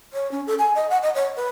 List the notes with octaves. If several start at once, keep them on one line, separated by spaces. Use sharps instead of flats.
C#5
C#4
A4
G#5
D#5
F#5
D#5
C#5
B4